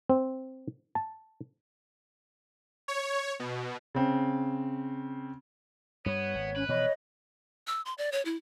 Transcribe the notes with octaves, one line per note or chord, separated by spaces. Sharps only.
C4
A5
C#5
B2
C#3 C4
G2 G3 B3 C#5
G#1
C#4 B4
B2 E3 F3 C#5 D#5
E6
C6
D5
C#5
E4